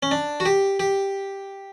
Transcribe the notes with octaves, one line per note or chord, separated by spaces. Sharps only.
C#4
D4
F#4
G4
G4